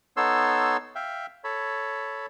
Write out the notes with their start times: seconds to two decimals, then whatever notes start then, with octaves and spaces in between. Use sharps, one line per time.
0.17 B3 D#4 A4 C#5 C6 E6
0.96 E5 F5 G5
1.44 A4 C#5 B5